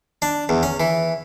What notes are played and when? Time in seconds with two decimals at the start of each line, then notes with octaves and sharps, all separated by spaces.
0.22 D4
0.49 E2
0.63 C#4
0.80 E3